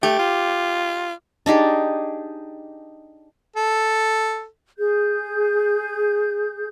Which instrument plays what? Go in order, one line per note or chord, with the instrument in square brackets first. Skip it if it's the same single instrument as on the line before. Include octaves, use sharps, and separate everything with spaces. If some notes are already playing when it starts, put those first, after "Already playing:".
[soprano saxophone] A3 [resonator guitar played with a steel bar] G4
[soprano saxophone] F4
[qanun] D4 D#4 G4 G#4
[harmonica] A4
[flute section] G#4 G6